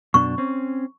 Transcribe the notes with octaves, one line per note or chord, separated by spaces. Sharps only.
F#2 B2 D4 C#6
C4 C#4